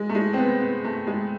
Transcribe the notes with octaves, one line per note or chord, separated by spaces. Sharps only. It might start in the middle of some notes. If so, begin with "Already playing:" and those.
Already playing: G#3
A3
G#3
C4
B3
B3
A3
G#3